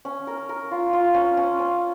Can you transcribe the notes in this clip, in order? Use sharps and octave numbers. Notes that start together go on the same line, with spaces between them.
C#4
A#4
A#4
F4
F4
C#4
C#4
C#4